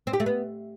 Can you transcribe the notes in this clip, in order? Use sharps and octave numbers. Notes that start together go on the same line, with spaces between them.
C4
G4
A3
B3